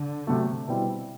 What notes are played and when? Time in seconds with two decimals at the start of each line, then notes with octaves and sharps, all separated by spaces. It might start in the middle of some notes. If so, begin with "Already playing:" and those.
Already playing: D3
0.27 C3 F#3 A3
0.68 B2 G3 C4 E4